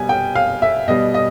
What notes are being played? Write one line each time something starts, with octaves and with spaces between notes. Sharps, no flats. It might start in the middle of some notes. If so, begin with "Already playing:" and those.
Already playing: B2 G3 G#5
G5
F5
E5
B2 G3 D#5
D#5